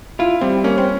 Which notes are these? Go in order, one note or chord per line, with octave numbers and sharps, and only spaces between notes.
E4 F4
G3 C4
A#3 C#4
C4